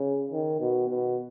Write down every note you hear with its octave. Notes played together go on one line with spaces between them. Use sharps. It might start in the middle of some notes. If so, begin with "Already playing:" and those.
Already playing: C#3
D#3
B2
B2